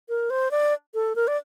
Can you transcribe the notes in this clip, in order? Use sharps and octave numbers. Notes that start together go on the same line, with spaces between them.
A#4
C5
D5
A4
A#4
D5